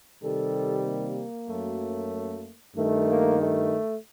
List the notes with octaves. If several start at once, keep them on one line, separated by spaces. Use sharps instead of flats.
C3 D#3 G3 A4
A#3
F#2 F#3 A3
G2 D#3 A3
A#3
A3